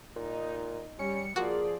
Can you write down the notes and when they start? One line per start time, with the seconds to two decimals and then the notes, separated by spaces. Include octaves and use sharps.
0.16 A#2 D#4
0.99 G3 C#4 C#7
1.36 F3 A#3 F4 F#4 G#4 D5